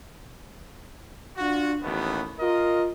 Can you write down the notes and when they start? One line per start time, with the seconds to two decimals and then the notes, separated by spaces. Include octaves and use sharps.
1.37 D4 F4 F#4
1.83 A1 D#2 A3 B3
2.39 F4 A#4 D#5